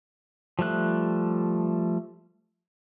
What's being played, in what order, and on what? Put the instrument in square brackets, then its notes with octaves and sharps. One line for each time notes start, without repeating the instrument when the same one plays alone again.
[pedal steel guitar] F3 G3 A3 F#6